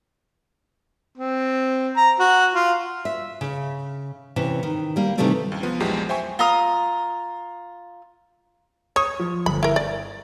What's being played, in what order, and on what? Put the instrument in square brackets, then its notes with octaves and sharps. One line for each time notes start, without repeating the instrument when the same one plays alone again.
[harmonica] C4
A#5
F#4
F4
[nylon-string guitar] E5
C#3
C3 E3 C#4
D#3
G3 A#3
C3 D#3 E3 G3 A3 C4
[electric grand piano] C#2
F3 B3
A#1 E2 F3 F#3 G#3 G4
C5 E5 G5 G#5 C#6
[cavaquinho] F4 A#5 D#6
[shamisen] C#5 [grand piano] D#6
[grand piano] F3
[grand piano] G1 [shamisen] B5
[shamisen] E4 A#4
[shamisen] D5 [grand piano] A6